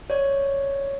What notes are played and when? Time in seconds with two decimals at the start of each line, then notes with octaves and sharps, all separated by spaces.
0.10 C#5 D5